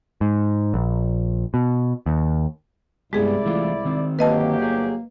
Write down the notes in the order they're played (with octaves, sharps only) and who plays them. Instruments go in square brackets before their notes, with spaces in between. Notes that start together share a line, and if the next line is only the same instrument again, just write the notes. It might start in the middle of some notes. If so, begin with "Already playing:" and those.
[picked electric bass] G#2
A#1
B2
D#2
[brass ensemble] C2 E4 D5 [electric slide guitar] G2 B3 G4 [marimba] G#3 G#4
[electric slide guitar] E3 A3 F4
D#3 C4
[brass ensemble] G1 F#3 G4 [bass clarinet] A#3 [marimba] B4 D#5 A5
[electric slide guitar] G#4